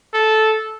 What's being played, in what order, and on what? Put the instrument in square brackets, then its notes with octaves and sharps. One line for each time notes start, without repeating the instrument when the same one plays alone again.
[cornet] A4